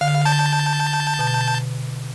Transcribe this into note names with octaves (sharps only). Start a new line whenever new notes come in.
D3 F5
A5 G6
B2